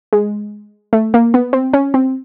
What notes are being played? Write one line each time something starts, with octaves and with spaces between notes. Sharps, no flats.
G#3
A3
A#3
B3
C4
C#4
C4